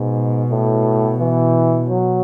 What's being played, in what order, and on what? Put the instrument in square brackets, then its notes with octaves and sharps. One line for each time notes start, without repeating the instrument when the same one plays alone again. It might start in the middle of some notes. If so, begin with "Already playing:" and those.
Already playing: [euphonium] G#2 [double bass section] B2
[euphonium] A2
E3
F#3